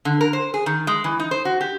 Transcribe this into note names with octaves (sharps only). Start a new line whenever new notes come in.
D3
A#4
C5
G#4
D#3
G#3
E3
D#4
C5
F#4
G4